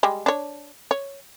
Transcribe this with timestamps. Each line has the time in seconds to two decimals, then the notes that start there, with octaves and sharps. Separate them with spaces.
0.03 G3 G#3
0.26 D4 C#5
0.91 C#5